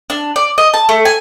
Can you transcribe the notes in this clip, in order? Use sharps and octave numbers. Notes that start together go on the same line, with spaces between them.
D4
D5
D#5
A5
A3
G#5